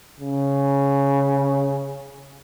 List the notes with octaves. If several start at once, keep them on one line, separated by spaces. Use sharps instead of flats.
C#3